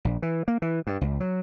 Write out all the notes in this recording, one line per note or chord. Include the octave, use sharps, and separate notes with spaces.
A#1
E3
A#3
E3
G2
C#2
F#3